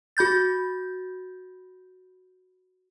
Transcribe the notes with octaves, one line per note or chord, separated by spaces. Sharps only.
F#4 B5 G6 A6